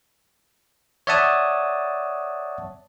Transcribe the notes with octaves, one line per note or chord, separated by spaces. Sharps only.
C#5 D5 E5 F#5 A5 D#6